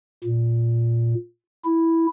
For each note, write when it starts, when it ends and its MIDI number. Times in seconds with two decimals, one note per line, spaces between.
0.24 1.14 46
1.64 2.06 64